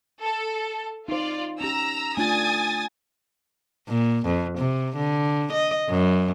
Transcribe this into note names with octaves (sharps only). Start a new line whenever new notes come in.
A4
D#4 F4 C5 D5
C#4 G4 A#5 E6
A3 D4 F4 G#5 D#6 A6
A#2
F2
C3
D3
D#5
F#2